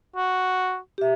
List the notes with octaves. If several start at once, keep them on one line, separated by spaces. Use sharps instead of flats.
F#4
G4 E5